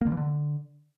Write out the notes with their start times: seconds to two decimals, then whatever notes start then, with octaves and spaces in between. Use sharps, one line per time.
0.01 A#3
0.07 D3
0.12 E3
0.17 D3